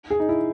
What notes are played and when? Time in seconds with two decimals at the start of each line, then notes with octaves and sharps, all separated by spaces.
0.10 G#4
0.20 D#4
0.29 E4